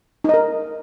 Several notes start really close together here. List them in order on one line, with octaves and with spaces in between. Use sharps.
D#4 D#5 A#4